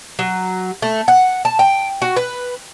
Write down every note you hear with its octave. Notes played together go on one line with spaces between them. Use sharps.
F#3
A3
F#5
A5
G5
F#4
B4